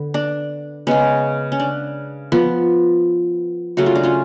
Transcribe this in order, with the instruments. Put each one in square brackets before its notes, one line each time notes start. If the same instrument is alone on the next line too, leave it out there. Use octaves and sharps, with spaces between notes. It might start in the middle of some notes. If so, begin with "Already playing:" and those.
Already playing: [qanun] D3 B3
D4
C#3 G#3 B3 C#4
C#4
D4
F3 B3
C#3 F#3 A3 F#4
F4
D4
C#4 F4